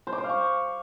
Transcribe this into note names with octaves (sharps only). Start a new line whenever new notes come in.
C5
D6
C5
F5
C#6